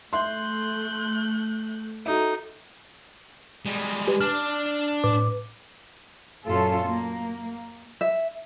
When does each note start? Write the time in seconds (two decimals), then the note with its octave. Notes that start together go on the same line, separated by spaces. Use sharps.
0.13 A3 E5 C6 F#6 G6
2.06 D#4 F#4 A4 E5
3.66 G3 G#3
4.08 G4 B4
4.21 D4 D5 F6
5.04 A2 B4 D6
6.47 F#2 A#2 C#4 F4 A4
6.87 A#3
8.01 E5